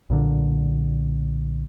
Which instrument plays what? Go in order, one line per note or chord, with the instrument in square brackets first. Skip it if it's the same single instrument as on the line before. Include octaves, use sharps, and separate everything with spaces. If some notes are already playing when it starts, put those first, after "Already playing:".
[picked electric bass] B1 A#2 D3